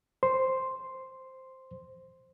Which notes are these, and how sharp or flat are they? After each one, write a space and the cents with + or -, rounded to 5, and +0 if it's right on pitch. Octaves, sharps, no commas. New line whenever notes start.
C5 +0 C6 +0